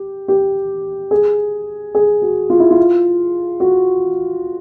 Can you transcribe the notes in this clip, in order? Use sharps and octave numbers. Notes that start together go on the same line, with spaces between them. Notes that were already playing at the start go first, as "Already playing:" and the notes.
Already playing: G4
G4
G#4
G#4
F#4
F4
E4
F4
F#4